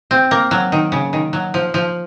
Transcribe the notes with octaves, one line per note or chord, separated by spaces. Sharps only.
C4
A#3
F#3
D#3
C#3
D#3
F#3
F3
F3